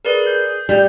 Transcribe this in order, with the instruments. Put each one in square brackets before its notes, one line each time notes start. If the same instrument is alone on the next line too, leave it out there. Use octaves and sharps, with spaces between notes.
[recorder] G#4 [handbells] A#4 B4 D5
[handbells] G6
[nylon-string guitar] G3 [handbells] G6